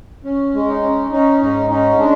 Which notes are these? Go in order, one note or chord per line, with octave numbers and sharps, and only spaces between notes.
C#4
G#3
D#4
C#4
C#4 D#4
G#2 D#4
C#4 D#4
G#3 D4